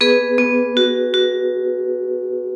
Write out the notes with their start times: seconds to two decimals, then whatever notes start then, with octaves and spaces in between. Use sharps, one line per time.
0.01 B3 G#4 B4
0.38 B3
0.77 F#4
1.14 F#4